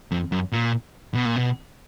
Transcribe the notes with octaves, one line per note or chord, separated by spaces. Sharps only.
F2
F#2
A#2
B2
A#2
B2